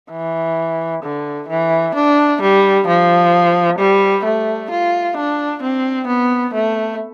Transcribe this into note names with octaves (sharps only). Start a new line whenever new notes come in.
E3
D3
E3
D4
G3
F3
G3
A3
F4
D4
C4
B3
A3